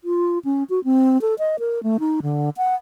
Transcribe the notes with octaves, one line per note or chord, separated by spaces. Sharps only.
F4
C#4
F#4
C4
A4
D#5
A#4
A3
D#4
D3
F#5